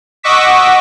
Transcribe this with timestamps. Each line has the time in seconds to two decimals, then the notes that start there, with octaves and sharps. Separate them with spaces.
0.23 D#5 F#5 C#6 D6 E6 B6